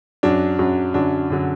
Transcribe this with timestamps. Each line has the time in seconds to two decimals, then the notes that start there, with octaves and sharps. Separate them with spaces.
0.23 F#2 F#3 D4
0.59 F#2 F#3
0.94 F#2 D3 F#3 D4
1.30 F#2 D3 F#3